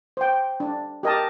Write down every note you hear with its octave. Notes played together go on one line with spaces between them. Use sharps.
C5 G5
D4
G4 A#4 D#5 A5